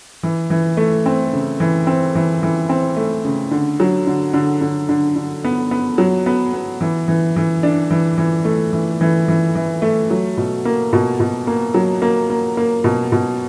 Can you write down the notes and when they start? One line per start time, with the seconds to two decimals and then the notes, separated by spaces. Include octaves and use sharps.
0.23 E3
0.50 E3
0.77 A3
1.06 C4
1.33 C#3
1.60 E3
1.87 C4
2.15 E3
2.43 E3
2.69 C4
2.96 A3
3.25 C#3
3.51 D3
3.80 F#3
4.07 D3
4.34 D3
4.61 D3
4.89 D3
5.16 D3
5.44 B3
5.71 B3
5.98 F#3
6.26 B3
6.53 B3
6.81 E3
7.08 E3
7.36 E3
7.63 D4
7.91 E3
8.18 E3
8.45 A3
8.73 E3
9.01 E3
9.28 E3
9.55 E3
9.82 A3
10.11 F#3
10.37 B2
10.65 A#3
10.93 B2
11.20 B2
11.47 A#3
11.74 F#3
12.02 A#3
12.30 A#3
12.57 A#3
12.84 B2
13.12 B2